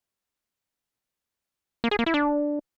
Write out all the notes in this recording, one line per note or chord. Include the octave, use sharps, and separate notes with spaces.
A#3
G#4
A#3
E4
D4